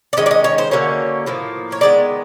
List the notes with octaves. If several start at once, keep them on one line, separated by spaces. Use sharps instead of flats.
D5
D#3 G#3 C#4 D#5
D5
D#5
C#5
C5
D3 F#3 A#3 C#4 C#5
A2 F3 A#3
C#5
D#3 G#3 B3 D5